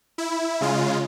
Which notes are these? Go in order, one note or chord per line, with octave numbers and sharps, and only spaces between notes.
E4
C#3 G#3 F4